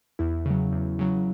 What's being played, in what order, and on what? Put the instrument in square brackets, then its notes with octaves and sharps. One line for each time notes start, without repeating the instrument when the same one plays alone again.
[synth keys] E2 E4
C#3 F#3
E2
C#3 F#3